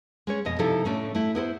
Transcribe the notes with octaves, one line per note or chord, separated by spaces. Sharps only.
G#3 C#4 C#5
F2 B2 D#5
C3 F3 D#4 E4 A4
A2 A3 C#4 D4
A3 E4
B3 E4 A#4 C5